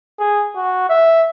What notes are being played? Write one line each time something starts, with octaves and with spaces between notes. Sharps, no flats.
G#4
F#4
E5